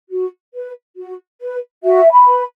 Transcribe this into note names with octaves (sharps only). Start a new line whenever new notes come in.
F#4
B4
F#4
B4
F#4 E5
B5
B4